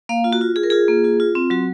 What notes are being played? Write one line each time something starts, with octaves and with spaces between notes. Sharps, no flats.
A#3 F5
F4
F#4
F4
F4 G#4
A#4
F4 G#4
A#3
F4
F4
C4
F#3 F#4